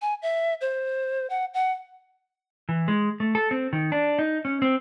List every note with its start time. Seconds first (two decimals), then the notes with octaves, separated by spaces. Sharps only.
0.02 G#5
0.22 E5
0.61 C5
1.30 F#5
1.54 F#5
2.69 E3
2.88 G#3
3.20 A3
3.35 A4
3.51 C4
3.73 D#3
3.92 D4
4.19 D#4
4.45 C#4
4.62 C4